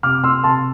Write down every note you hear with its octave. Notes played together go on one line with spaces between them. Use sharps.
C3 D6 F6
C6 E6
C3 A5 C6